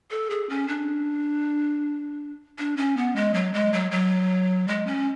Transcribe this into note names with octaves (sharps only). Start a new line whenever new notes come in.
A4
G#4
C#4
D4
D4
C#4
B3
G#3
F#3
G#3
F#3
F#3
G#3
C#4